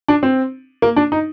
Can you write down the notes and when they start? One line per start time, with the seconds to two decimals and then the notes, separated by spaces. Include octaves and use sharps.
0.08 D4
0.23 C4
0.82 A#3
0.97 D4
1.12 D#4